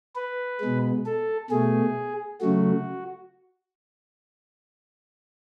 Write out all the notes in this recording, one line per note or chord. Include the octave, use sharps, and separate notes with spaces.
B4
B2 G#3
A4
B2 A3 G#4
C#3 F#3 A3 F#4